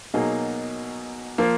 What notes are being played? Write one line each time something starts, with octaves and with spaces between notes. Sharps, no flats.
B2 F#3 A#3 D#4 G#4
F3 A#3